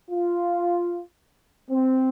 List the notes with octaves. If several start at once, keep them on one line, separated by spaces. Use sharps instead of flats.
F4
C4